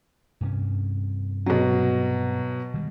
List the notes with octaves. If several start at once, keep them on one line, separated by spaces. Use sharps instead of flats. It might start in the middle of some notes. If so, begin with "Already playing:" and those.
G2 C3 C#4
B2 F#3
D#3 G3 G#3